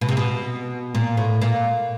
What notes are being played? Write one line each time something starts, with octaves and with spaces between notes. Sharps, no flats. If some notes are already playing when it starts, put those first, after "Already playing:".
B2
C3
B2
A#2
A2
A#2